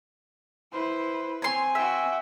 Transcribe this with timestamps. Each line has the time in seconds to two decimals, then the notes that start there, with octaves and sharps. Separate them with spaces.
0.72 E4 B4 C5
1.42 C4 C#5 G#5 C6
1.75 F#4 E5 G5